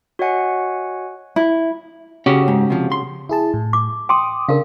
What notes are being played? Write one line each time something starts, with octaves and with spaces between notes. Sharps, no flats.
F#4 C#5 D#5 F#5 G#5
E4
C#3 C#4 F#4 G4
G#2
C3 F3
C6
E4 G#4 A5
A2
D6
G5 C6 D6 D#6
C#3 D4 A#4 F5